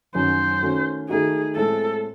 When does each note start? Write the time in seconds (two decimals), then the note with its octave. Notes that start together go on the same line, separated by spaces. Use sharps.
0.15 F#2 D#3 F#3 C#4 F#4 C5
0.63 D#3 A3 C#4 F#4
1.09 D#3 A3 D#4 F#4 G#4
1.56 A2 G#3 C4 A4